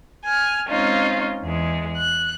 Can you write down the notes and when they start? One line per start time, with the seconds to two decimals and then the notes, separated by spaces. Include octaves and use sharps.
0.25 G#5 F6
0.69 G#3 C4 C#4 D#4 F4
1.43 E2 G#3
1.96 F#6